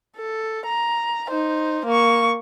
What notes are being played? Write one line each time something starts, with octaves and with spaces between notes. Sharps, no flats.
A4
A#5
D#4 C5
A#3 C#6